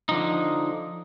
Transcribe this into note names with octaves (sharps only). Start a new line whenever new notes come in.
D3 F3 D#4